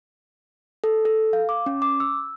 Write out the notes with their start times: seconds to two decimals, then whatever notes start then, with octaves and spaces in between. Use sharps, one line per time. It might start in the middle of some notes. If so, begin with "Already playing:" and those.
0.84 A4
1.05 A4
1.33 F5
1.49 D6
1.66 C#4
1.82 D6
2.00 E6